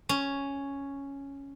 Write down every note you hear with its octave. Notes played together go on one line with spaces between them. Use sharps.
C#4